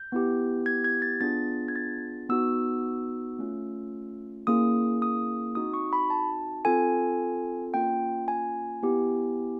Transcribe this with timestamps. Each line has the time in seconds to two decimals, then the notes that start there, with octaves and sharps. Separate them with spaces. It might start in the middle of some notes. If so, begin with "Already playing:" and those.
Already playing: G6
0.12 B3 E4 G4
0.66 G#6
0.84 G#6
1.02 A6
1.21 B3 D4 F4 G#4 A6
1.68 G#6
1.76 A6
2.29 B3 D#4 F#4 E6
3.39 A3 C#4 F4
4.47 A#3 C#4 E4 G#4 D#6
5.02 D#6
5.55 C4 D#4 F#4 D#6
5.74 C#6
5.93 B5
6.10 A5
6.65 C4 F4 A4 G#5
7.74 A#3 C#4 F4 G5
8.28 G#5
8.83 B3 E4 G4